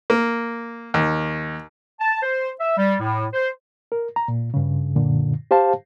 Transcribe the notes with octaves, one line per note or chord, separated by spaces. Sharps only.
A#3
D#2
A5
C5
E5
G3
A2
C5
A#4
A#5
A#2
G2 C#3
F#2 A#2 D3
G4 C5 F5 A5